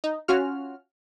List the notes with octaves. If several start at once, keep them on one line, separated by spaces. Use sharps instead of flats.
D#4
C#4 F4 F#4 F6